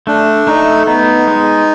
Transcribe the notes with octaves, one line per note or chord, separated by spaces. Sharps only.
A3 D4
A3 D#4
B3 D#4
G#3